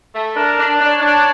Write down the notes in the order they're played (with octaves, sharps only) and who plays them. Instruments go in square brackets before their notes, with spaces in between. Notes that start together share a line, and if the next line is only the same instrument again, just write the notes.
[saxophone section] A3
[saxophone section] D4 [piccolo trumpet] A#4
[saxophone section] D4
[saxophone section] D4 [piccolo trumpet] C#5
[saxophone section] D4